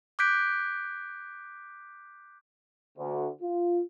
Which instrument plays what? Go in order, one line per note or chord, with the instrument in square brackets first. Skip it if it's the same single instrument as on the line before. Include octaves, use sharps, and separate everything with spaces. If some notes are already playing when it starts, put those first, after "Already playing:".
[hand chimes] D6 F#6 G6 B6 D7
[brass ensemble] D2
F4